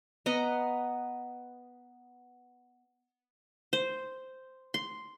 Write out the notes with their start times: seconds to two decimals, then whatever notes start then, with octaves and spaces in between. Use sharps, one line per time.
0.26 B3 D#5 F#5 A#5
3.73 C5
4.74 C6